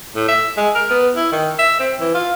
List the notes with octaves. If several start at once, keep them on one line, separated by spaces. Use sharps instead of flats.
A2
E5
G#3
A#4
B3
E4
D#3
E5
C4
E3
F4